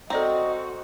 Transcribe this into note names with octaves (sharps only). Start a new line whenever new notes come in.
C4 F#4 A4 D5 D#5 A#5